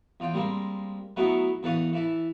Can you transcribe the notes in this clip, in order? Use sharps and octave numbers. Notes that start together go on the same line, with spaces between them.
E2 F4 G5
G3 G#3 A#3 C4
F#3 A3 B3 D#4 E4 F#4
E2 A4 B4 F5 C#6 D#6
E3 E4 A4